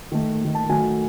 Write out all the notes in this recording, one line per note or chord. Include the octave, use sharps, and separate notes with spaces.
D#3 A3
D#3 A3
A5
D#3 F#3 A3 G#5